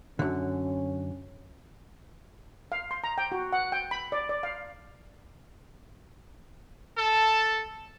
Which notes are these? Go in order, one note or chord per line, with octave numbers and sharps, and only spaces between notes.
F#2 D3 C#4
F5
C6
A#5
G5
F#4
F#5
G5
B5
D5
D5
F5
A4 A5